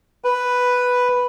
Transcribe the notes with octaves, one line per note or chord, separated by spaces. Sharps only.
B4